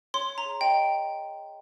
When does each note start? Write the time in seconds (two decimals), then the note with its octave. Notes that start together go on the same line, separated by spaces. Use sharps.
0.14 C#5 C6
0.30 C#5
0.38 A#5
0.45 G#4
0.61 D#5 G5